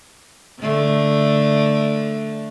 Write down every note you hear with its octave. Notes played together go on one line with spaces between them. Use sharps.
D3 A3